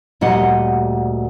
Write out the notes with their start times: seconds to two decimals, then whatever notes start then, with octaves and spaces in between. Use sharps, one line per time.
0.21 D2 A#2 G3 D#5 F#5